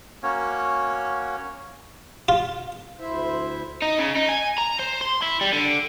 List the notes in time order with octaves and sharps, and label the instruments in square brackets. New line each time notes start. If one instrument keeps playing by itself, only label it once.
[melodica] A#3 C#4 F#4 C#5
[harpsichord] F4
[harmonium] D2 E4 C5 E5
[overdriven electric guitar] D#4
C#3
D#4
G#5
A#5
C5
C6
E4
G3
D3